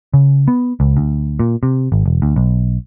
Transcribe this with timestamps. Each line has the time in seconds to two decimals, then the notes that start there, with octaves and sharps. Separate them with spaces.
0.14 C#3
0.48 B3
0.80 C#2
0.97 D2
1.40 A#2
1.63 C3
1.92 G#1
2.06 E1
2.22 D2
2.36 B1